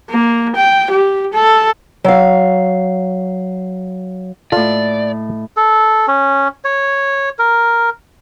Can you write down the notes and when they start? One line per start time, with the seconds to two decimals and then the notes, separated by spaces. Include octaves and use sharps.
0.11 A#3
0.56 G5
0.91 G4
1.34 A4
2.04 F#3 F5
4.52 A2 F4 A4 D5 D#5
5.57 A4
6.08 C#4
6.65 C#5
7.39 A#4